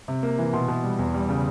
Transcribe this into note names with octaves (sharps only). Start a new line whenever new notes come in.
C3
A#3
E3
B2 C6
B2
G3
E2
G3
C#3